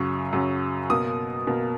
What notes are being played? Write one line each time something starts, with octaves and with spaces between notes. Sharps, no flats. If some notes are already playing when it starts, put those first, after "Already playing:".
Already playing: F#2 C#3 F#3 C#6
F#2 C#3 F#3
B2 A#3 D#6
B2 A#3